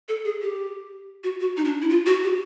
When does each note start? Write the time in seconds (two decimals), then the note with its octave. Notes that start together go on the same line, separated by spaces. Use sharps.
0.08 A4
0.25 G#4
0.42 G4
1.24 F#4
1.40 F#4
1.57 D#4
1.65 D4
1.82 E4
1.90 F4
2.06 F#4
2.23 G4